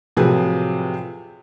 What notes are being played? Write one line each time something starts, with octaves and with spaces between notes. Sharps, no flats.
A2 C3 F3 F#3 G#4 B4